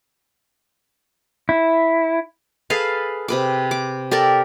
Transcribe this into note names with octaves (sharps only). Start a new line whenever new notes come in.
E4
G#4 A4 B4 F5
C3 B4 D6
D6
G4 A4 A#4 D5